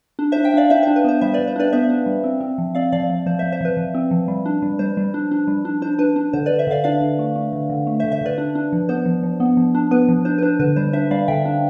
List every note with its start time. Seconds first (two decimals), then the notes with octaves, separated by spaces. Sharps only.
0.19 D4
0.32 D4 C5 E5
0.44 E5 G5
0.54 D4 D5 F5
0.70 D4 C5 E5
0.83 D4 C5
0.96 B4
1.04 B3 C5
1.21 G3 C5 E5
1.34 G3 B4 D5
1.48 C5
1.56 D4 B4 D5
1.72 B3 C5 E5
1.90 D4
2.06 G3
2.24 C4
2.41 C4
2.58 F3
2.75 C4 D5 F5
2.92 F3 D5 F5
3.10 F3
3.26 F3 C5
3.39 F3 C5 E5
3.52 C5 E5
3.61 F3 B4
3.77 F3
3.94 C4
4.11 F3
4.28 G3
4.46 D4
4.62 G3
4.79 G3 C5
4.97 G3
5.14 D4
5.31 D4
5.48 G3
5.65 D4
5.82 D4 C5
5.99 D4 B4
6.16 D4
6.33 D3 C5
6.46 D3 B4 D5
6.59 C5 E5
6.67 D3 D5 F5
6.84 D4 D5 F5
7.01 D3
7.19 A3
7.36 A3
7.53 D3
7.69 D3
7.87 A3
8.00 C5 E5
8.04 D3
8.12 C5 E5
8.21 D3 B4 D5
8.38 D4
8.55 D4
8.73 F3
8.89 B3 C5
9.06 F3
9.23 F3
9.40 B3
9.57 F3
9.75 D4
9.91 B3 B4
10.08 F3
10.25 D4 C5
10.38 B4
10.42 D4 C5
10.59 D3 B4
10.76 G3 C5
10.93 D4 C5 E5
11.11 G3 D5 F5
11.28 D3 E5 G5
11.45 D4